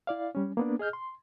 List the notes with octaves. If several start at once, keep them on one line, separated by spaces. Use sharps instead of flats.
E4 D5 F5
G3 C#4
A#3 B3 D4
G#4 D#5 F6 G6
C6